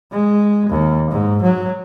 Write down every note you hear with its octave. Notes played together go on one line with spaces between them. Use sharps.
G#3
D#2
G#2
F#3